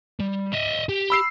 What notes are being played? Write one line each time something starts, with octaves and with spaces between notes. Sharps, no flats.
G3
D#5 E5
G4
B5 E6 C7